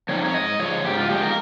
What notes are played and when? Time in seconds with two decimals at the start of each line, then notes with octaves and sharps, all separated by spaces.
0.09 F3 C4 D#4 C#5
0.25 C#5
0.34 G#2 D#5
0.59 F3 G#3 C#5
0.84 G#2 G4
0.97 F4
1.09 F3 G#3 G4
1.23 A#4